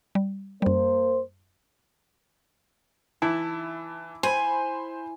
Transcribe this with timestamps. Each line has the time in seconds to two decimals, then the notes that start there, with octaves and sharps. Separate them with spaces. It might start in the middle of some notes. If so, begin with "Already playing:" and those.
0.15 G3
0.62 F#2 G3 A#3 C5
3.22 E3 E4 A5
4.23 C5 G#5 B5